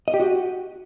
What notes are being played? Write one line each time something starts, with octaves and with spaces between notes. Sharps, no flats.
D#5
G4
F#4